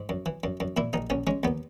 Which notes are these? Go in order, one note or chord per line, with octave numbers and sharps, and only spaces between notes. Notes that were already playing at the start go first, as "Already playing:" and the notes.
Already playing: G#2
F#2
E3
F#2
F#2
A#2 E4
A#1 D#4
A#1 C#4
G#3 C#4
D#2 B3